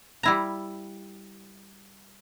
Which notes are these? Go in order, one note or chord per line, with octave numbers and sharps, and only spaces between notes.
G3 E4 A#5